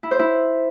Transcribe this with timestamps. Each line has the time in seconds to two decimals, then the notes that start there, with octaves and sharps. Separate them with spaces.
0.03 E4
0.11 C5
0.19 E4